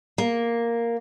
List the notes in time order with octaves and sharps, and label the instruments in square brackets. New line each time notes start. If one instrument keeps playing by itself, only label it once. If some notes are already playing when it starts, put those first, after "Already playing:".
[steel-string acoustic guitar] A#3